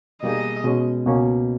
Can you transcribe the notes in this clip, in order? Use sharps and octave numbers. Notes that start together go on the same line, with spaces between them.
B2 G3 A#3 D#4 G#4 D#5
B2 G#3 C#4
C#2 B2 A#3 C#4